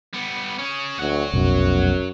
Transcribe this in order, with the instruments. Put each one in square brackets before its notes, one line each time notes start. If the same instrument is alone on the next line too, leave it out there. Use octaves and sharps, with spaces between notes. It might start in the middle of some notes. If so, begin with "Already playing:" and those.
[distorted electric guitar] G3 B3
C#4 G#4
[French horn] D2 [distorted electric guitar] C#5 F#5
[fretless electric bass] F1 B1 [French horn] F#2